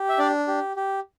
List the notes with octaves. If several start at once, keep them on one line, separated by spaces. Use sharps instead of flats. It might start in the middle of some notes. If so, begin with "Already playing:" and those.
Already playing: G4
E5
D4 D5
G4
G4